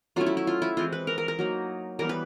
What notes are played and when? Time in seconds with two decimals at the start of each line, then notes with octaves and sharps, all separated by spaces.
0.16 F#3 A3 C#4 E4 F4
0.26 E4
0.37 E4
0.47 F4
0.62 E4
0.77 E3 G#3 C4 F4
0.92 B4
1.07 A#4
1.18 A#4
1.28 A#4
1.39 F#3 A#3 D#4
1.99 E3 G3 B3 A#4
2.09 B4